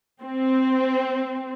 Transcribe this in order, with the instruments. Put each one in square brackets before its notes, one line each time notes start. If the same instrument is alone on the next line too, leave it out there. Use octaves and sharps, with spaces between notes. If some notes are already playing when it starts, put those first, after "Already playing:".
[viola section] C4